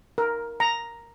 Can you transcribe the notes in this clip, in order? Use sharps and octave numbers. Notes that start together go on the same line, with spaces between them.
A#4
A#5